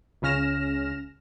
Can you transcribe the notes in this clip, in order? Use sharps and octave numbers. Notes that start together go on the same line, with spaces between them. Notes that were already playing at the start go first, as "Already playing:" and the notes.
C#2 C#3 C#4 F6 A#6 E7